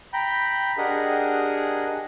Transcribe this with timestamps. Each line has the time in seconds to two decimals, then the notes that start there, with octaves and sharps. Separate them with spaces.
0.13 G5 A#5 B5 G6
0.78 D4 G4 G#4 A#4 D#5 F#5